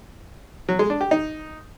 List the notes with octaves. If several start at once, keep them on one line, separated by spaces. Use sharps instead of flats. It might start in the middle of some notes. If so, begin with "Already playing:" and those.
F#3
G#3
D4
G4
D#4